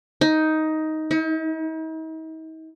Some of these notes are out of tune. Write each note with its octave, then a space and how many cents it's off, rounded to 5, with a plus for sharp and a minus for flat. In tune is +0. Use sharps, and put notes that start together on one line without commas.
D#4 +10
D#4 +45